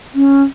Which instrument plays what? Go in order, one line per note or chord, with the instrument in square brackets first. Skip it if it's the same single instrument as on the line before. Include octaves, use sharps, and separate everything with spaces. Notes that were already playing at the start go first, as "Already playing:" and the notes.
[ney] C#4